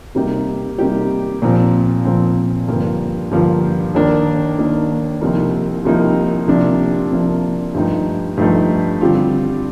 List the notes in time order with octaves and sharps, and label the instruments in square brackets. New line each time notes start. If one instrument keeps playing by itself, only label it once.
[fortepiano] C3 G3 A#3 D#4 G4
C3 G3 A#3 D#4 G4
A#2 F3 C4
A#2 F3 C4
G2 D3 F3 A#3 F4
G2 D3 F3 A#3 F4
D#2 D#3 A#3 D4
D#2 D#3 A#3 D4
C2 C3 F3 A#3 D#4
C2 C3 F3 A#3 D#4
C3 F3 A#3 D4
C3 F3 A#3 D4
G2 F3 A3 D#4
G2 F3 A3 D#4
D3 G3 C4 F4